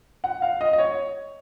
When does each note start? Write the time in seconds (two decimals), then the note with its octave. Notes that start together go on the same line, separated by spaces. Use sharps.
0.24 F#5
0.42 F5
0.61 D#5
0.73 D#5
0.78 C#5